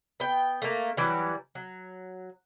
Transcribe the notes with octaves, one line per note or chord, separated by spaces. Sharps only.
B3 G5
A3 A#3
E3 F#3 G3
F#3